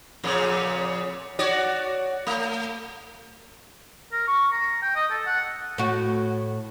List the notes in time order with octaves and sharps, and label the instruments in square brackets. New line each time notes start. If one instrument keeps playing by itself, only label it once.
[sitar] F2 A#2 C#3
F#4 C#5 D5
A3
[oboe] A#4
C#6
A#5
G5
D#5
A4
F#5
[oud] A2 F#4